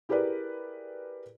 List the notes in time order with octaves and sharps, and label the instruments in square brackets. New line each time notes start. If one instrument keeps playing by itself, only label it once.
[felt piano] E4 G4 G#4 A#4 B4 D5